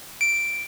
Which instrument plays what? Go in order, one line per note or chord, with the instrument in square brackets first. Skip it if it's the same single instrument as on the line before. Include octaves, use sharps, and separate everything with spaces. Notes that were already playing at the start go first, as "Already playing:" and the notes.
[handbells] D7